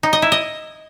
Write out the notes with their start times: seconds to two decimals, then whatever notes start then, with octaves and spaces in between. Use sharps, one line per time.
0.03 D#4
0.13 D#5
0.22 E4
0.32 D#5